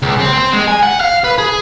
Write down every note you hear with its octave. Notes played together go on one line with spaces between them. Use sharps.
C#2
C4
C4
G#3
G#5
F#5
F5
B4
G#4